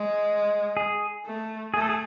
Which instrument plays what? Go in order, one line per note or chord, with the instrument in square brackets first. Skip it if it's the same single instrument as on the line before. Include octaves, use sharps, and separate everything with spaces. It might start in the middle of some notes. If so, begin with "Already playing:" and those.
Already playing: [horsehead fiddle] G#3
[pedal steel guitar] G#4
[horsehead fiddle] A3
[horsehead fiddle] A3 [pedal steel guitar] G#4
[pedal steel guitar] A4
G#4